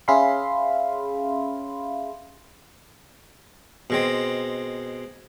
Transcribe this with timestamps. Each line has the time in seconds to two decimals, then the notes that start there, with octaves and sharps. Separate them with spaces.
0.08 C#4 G#4 E5 F5 B5 C6
3.90 B2 G#3 C4